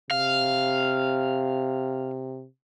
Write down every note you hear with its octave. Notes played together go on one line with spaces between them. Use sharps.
C3 F5